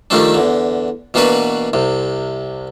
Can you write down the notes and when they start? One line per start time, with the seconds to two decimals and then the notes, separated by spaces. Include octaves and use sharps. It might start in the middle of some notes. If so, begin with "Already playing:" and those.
0.10 D#3 F3 G3 A3 C4 D4
0.34 E2 D3
1.14 B2 E3 A#3 D4 F#4 B4
1.73 C2 C3